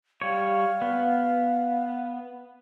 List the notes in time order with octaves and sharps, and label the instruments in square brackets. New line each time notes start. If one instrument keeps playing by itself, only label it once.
[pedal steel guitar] G3 C#5 [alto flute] F5
[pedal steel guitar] B3